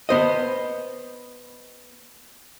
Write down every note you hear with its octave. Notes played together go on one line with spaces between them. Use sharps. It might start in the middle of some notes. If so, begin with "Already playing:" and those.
B3 C5 D#5